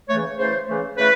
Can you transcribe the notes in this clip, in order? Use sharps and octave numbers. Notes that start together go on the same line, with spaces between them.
C#3 E3 A3 C#5
C#3 E3 A3 C5
C#3 E3 A3
C#3 E3 A3 B4